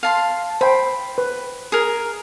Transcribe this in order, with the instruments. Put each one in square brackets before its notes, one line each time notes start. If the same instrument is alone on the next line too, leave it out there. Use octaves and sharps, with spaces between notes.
[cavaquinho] F5 A5 C6
[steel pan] C5 G5 [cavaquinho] B5
[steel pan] B4
[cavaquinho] G#4 A#4